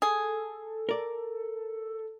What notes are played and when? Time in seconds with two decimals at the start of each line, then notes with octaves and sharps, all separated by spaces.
0.02 G#4 A4
0.89 A#4 D5